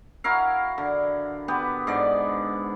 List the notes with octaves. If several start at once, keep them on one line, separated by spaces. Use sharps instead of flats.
E4 F#4 A#4 F5
D3
B3 G4 B4
G#2 D3 D5